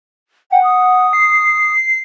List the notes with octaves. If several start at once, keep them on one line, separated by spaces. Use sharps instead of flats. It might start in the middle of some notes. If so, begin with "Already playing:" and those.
F#5 G5
D#6
C7